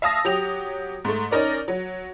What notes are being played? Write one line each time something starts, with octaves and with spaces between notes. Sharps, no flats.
E5 F5 A5 D#6 A#6
F#3 G4 F7
G#2 A3
C#4 D#4 A#4 D5
F#3